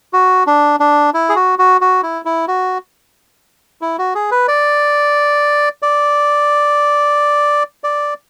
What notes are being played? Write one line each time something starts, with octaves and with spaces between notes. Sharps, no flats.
F#4
D4
D4
E4
G#4
F#4
F#4
F#4
E4
E4
F#4
E4
F#4
G#4
B4
D5
D5
D5